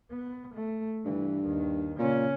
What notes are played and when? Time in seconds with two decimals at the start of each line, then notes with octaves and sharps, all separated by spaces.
0.11 B3
0.54 A3
1.05 G2 E3
1.44 D#2 D#3
1.99 A#2 C#3 C#4